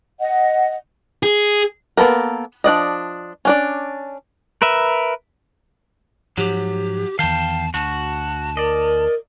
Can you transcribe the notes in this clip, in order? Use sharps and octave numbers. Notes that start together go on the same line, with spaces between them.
D#5 F#5
G#4
A#3 B3 A4 A#4
F3 D4 D5 D#5
C#4 D4 D5
A#4 B4 E5
G#2 F3 F#3 G4
E2 D#3 F5 G5 A5
D2 F#4 A5
A#4 D5 D#5